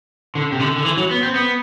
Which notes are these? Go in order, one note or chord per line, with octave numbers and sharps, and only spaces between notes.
D3
C3
D3
D3
E3
F#3
B3
C4
B3